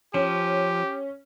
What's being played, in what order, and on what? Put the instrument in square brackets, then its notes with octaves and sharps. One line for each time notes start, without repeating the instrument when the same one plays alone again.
[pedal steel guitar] F3 [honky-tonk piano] C#4 [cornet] G4